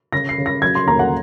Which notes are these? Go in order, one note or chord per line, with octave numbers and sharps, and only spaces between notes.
C#3 A#6
C7
C#3
A#6
F#3 G#6
C6
D#2 A#5
F#5